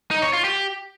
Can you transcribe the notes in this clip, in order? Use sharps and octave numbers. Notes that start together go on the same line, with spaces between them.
D#4
C#5
F4
G4